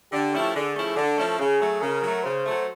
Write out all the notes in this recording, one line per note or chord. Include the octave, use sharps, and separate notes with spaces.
D3 G4
F3 A3 C#4 E4
D3 G#4
F3 A3 C#4 E4
D3 A4
F3 A3 C#4 E4
C#3 G#4
F#3 A3
C#3 A#4
F#3 A3
C#3 C5
F#3 A3